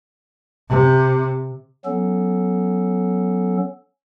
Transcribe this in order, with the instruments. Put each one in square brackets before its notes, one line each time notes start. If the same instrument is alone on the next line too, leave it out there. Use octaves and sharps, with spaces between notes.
[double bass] C3
[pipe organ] F#3 B3 C#4 A4